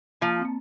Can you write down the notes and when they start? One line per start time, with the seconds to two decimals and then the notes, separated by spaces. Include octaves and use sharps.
0.21 F3 A#3
0.39 C4
0.45 A#3